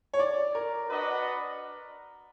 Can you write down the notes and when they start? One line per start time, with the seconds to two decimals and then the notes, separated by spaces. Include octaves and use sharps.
0.14 C#5
0.19 D5
0.55 A#4
0.88 D4 F#4 B4 D#5 F#5